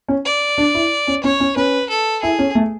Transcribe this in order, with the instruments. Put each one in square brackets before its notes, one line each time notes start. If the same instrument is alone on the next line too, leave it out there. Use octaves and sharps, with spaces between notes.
[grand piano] C#4
[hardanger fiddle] D5
[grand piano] D4
E4
C#4
[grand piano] C#4 [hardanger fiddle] C#5
[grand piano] C#4
[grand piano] C#4 [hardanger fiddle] B4
[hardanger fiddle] A4
[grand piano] E4 [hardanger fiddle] G#4
[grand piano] C#4
A3